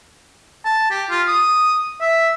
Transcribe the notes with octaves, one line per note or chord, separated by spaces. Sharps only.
A5
G4
F4
D#6
E5